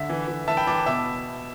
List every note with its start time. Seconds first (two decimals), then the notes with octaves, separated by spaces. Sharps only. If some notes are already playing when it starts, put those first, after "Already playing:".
Already playing: D3 E5
0.09 E3
0.28 E3
0.48 E3 E5 A5
0.57 G5 B5
0.67 E3 A5 D6
0.86 B2 E5 A5